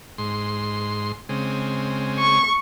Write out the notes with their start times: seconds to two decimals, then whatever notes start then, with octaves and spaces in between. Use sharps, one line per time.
0.18 G#2 C6
1.29 C#3 G#3 C4
2.19 C#6